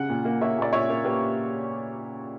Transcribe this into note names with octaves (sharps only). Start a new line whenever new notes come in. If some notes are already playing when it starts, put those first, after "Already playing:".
Already playing: C#3 F#5
A#2
A#3
A#3 C#5 E5
A#2 D5
A#2 C#5 E5
A#3
A#3 G4 B4